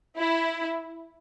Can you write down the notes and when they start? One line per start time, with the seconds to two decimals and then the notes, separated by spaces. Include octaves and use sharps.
0.17 E4